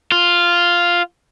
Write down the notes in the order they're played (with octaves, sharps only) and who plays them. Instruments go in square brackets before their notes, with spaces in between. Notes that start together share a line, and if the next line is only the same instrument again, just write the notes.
[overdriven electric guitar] F4